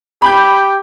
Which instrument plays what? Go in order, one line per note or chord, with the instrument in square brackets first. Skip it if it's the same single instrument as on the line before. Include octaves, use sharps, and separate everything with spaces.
[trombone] G4 [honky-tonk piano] B5 G6